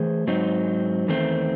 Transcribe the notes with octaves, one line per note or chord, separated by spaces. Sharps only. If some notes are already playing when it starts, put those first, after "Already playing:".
Already playing: E3 A3 G#4 C5
G#2 F#3 C4 D#4
E2 D#3 A3 C4